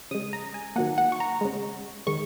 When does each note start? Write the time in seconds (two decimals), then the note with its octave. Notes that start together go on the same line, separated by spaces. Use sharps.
0.11 C#3 G#3 D#6
0.33 A#5
0.54 G#5
0.76 D#3 F#3 A#3 F#5
0.98 F#5
1.12 C#6
1.20 A#5
1.41 C#3 G#3
2.07 D#3 G#3 C#6